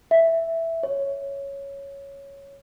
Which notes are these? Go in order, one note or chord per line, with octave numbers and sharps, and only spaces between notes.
E5
C#5